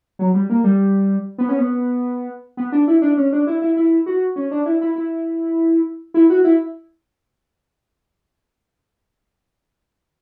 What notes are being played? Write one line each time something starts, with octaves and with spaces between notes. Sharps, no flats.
F#3
G3
A#3
G3
B3
C#4
B3
B3
D4
E4
D4
C#4
D4
E4
E4
E4
F#4
C#4
D4
E4
E4
E4
E4
F#4
E4